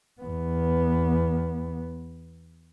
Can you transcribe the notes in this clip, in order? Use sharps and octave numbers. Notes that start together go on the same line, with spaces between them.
E2 B3